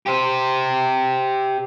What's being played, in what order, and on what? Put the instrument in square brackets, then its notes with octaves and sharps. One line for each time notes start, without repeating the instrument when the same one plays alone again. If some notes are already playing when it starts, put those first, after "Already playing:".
[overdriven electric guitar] G4 C5